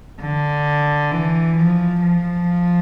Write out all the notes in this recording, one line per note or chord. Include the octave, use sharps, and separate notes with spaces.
D3
E3
F3
F3